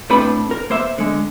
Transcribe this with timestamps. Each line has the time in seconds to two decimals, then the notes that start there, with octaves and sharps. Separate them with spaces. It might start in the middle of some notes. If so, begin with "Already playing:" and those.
0.10 A2 C4 D4 A4 B4 B5
0.51 A#4
0.70 A#3 C5 E5
0.98 D3 G#3